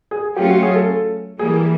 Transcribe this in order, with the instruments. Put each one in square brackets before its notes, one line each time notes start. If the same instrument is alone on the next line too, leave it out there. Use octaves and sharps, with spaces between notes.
[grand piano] G#4
[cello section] F#3 A3 C#4 F4 [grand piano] G4
[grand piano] F#4
G#4
A4
[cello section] E3 G3 A#3 [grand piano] G#4